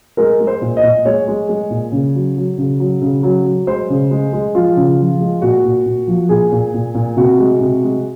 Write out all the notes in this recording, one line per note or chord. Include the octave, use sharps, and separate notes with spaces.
G#3 A#4
G#3
C5
A#2
D#5
A#2
G#3 C#5
G#3
G#3
A#2
C#3
F#3
F#3
C#3
F#3
C#3
F#3
F#3
G#3 C5
C#3
G#3
G#3
F3 F4
C#3
F3
G#3
A#2 F#4
A#2
A#2
F3
A#2 G#4
A#2
A#2
A#2
C3 F#4
G#3
C3
G#3